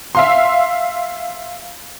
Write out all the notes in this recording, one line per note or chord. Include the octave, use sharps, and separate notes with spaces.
E5 F5 C6